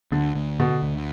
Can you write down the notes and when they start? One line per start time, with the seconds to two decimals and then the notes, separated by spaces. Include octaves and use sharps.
0.12 D2 D3
0.35 D2
0.59 B2 D3
0.82 D2